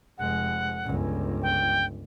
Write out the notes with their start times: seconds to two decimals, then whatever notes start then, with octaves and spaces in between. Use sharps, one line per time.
0.18 F1 G#3 F#5
0.84 G1 C#2
1.42 G5